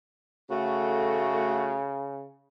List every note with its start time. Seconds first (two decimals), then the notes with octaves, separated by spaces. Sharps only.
0.50 C#3 A3 F#4